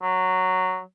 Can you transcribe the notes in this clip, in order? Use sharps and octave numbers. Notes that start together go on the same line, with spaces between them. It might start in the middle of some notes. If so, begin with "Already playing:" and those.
F#3